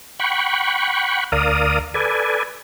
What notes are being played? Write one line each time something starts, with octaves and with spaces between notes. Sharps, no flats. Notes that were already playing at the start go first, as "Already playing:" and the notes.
F#5 G5 B5 C#6
D2 A#4 D5 F5 D#6
A4 B4 D5 G#5